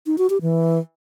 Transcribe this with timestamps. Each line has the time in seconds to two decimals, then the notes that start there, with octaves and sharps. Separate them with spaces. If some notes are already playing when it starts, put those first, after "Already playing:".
0.06 D#4
0.18 F#4
0.30 G4
0.42 E3